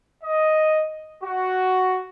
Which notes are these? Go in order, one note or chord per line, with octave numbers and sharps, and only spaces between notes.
D#5
F#4